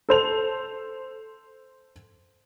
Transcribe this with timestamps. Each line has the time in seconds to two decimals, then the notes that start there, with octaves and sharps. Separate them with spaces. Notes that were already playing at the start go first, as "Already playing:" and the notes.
0.09 A4 C5 F7